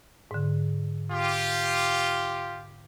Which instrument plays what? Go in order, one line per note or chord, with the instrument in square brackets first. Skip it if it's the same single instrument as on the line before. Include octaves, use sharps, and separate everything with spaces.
[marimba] G#2 D3
[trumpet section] F4 G4